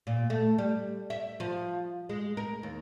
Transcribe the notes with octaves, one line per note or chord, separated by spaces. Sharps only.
A#2
A3
G3
E5
F3
G#3
A#4
D#2